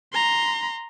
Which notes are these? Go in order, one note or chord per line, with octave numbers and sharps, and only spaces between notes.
A#5 C6